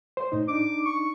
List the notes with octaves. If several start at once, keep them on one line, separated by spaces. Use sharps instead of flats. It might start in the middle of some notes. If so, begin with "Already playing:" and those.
C5
A2 D#4
D4 D#4 D6
C#6